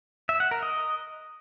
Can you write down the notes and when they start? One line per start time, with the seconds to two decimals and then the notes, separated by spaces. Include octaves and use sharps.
0.29 E5
0.40 F#5
0.51 A#4
0.63 D#5